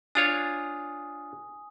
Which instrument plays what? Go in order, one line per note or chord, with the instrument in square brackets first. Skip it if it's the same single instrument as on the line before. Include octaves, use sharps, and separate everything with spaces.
[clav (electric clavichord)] D4 F4 C#5 [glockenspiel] G#5 D#6